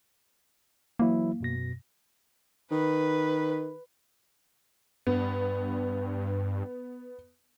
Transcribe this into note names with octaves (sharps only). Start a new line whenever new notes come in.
E3 F#3 A#3 E4
F#2 B2 A#6
D#3 B4
G2 B3